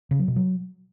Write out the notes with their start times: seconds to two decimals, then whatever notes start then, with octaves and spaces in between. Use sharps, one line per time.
0.11 C#3
0.19 F#3
0.28 B2
0.36 F#3